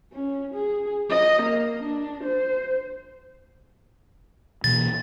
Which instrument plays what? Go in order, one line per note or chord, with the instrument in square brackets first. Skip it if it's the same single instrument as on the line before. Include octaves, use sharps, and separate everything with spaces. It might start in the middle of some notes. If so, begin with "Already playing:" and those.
[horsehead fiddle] C#4
G#4
D#5
A#3
D4
C5
[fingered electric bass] B2 E3 A#3 [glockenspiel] A6